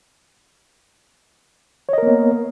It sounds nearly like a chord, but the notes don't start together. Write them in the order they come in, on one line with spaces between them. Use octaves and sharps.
C#5 D#5 A#4 A#3 B3